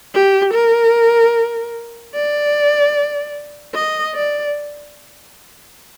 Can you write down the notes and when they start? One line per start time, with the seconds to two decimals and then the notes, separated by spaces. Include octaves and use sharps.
0.14 G4
0.54 A#4
2.15 D5
3.75 D#5
4.15 D5